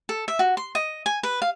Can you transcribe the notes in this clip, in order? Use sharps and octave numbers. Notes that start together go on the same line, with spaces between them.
A4
E5
F#4
C6
D#5
G#5
B4
F5